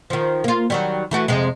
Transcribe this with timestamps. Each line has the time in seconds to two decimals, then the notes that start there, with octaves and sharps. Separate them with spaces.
0.10 D#3 F3
0.44 A#3 F4
0.70 D#3 F#3 G3
1.11 E3 A3 F#4
1.28 F2 C3 G#3